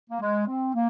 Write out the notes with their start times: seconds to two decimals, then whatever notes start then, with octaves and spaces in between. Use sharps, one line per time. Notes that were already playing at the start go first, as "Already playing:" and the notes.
0.10 A#3
0.21 G#3
0.47 C4
0.74 A#3